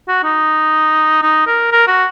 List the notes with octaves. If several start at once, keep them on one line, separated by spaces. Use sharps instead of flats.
F#4
D#4
D#4
A#4
A#4
F#4